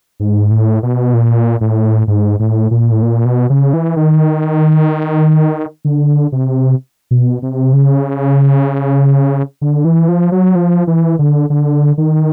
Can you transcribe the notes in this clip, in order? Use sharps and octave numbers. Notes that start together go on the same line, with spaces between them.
G#2
A2
B2
A#2
A2
G#2
A2
A#2
A2
A#2
B2
C#3
E3
D#3
D3
C3
B2
C3
C#3
D3
E3
F3
F#3
F3
E3
D3
D3
D#3